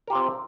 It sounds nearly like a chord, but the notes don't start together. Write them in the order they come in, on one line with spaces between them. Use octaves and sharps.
A#4 G4 F4 C4